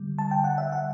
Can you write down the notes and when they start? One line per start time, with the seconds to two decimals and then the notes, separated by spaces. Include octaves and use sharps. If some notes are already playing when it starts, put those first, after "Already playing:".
Already playing: D3 G3
0.18 A5
0.31 G5
0.44 F#5
0.58 E5
0.72 F#5